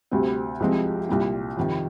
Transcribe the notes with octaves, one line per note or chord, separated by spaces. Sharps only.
D2 C3 G3 C4
C2 C3 F3 G#3 C4
C2 A#2 G3
F2 C3 D#3